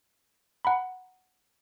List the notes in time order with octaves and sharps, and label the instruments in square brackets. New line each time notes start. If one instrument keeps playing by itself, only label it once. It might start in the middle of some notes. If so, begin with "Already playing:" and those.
[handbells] F#5 A#5 B5